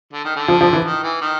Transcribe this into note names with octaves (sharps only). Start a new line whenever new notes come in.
D3
D#3
D3
F3
F3
E3
D#3
E3
D#3